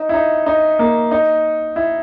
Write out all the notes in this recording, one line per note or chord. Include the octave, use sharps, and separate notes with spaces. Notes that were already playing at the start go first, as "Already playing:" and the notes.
Already playing: D#4
E4
D#4
D#4
A#3
D#4
E4